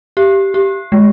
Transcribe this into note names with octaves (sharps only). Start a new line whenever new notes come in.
G4
G4
G#3